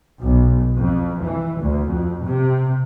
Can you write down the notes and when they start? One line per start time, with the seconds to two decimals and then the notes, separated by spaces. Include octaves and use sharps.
0.22 B1
0.78 F2
1.24 E3
1.60 D2
1.91 F2
2.24 C3